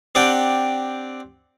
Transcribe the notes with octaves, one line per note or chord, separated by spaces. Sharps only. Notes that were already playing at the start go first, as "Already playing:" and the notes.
C4 D4 G4 D5 F#5 G5